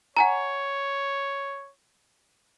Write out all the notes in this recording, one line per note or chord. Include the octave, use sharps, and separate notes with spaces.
C#5 F#5 G#5 A#5